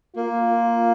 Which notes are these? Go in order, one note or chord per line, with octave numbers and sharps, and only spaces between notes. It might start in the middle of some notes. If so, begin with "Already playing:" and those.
A#3 F4